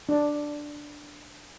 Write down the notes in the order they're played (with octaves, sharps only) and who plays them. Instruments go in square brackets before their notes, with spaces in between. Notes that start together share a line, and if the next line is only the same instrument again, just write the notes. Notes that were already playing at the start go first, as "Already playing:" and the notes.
[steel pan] D4